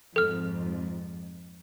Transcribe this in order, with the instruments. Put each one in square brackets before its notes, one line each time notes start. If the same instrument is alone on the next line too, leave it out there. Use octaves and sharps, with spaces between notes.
[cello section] F2 G#2 [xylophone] A4 F6